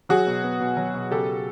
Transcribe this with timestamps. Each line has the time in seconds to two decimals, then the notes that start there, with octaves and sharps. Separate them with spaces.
0.09 F#3 F#4 G#4
0.27 B2
0.44 B3
0.60 B2
0.77 F#3
0.95 B2
1.11 C#3 G4 A4